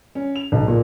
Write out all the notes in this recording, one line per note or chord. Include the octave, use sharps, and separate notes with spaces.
C#4
F7
B1
A#2